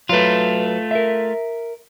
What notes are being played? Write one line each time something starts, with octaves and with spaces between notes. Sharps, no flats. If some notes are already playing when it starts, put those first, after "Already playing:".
F#3 A3 F4 B4
A#4 E5